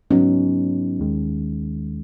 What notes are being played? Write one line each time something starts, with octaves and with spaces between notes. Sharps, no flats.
G#2 F#3 B3 C#4 D#4
D#2 D#3 G#3